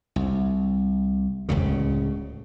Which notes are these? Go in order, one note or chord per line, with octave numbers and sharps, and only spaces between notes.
C2
D1 G#1 C#2 C#3